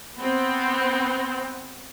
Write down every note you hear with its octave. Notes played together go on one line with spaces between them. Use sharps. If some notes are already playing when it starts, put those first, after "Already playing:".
B3 C4